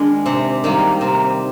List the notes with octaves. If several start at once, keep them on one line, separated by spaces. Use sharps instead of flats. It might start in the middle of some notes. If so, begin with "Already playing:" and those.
Already playing: D#3 G#3 D4
C3
D#3 G3 A#3
C3